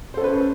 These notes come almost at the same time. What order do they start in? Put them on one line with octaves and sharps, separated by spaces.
C5 A4 C#4 B4